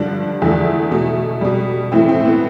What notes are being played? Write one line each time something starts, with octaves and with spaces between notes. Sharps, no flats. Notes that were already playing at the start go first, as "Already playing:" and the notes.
Already playing: G2 D3 F3 D4
E2 D3 F3 A3
B2 A3
B2 G3
A2 E3 A3 C4
C4
B3